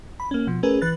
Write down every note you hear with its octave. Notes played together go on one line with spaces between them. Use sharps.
B5
A#3 C#4
B2 F3
A3 C#4 G#4 A#4 B4
E3 B4 F#6 A6